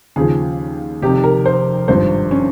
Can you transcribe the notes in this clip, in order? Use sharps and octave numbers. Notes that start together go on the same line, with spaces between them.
D#2 C#3 F3 G#4
F1 F2 C3 D#3 G4
A#4
C5
G#1 G2 F3 C5
C#4